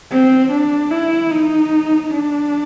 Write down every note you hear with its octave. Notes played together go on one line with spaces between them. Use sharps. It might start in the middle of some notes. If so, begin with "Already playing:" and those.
C4
D4
E4
D#4
D4